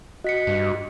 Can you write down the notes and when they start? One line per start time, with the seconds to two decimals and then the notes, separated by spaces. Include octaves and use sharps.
0.24 F#4 D#5 B6 C#7
0.47 G2